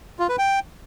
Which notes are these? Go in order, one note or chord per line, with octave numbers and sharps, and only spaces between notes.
F4
B4
G5